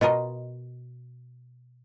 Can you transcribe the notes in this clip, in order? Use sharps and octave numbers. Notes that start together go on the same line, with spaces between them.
B2 F4 A#4 D#5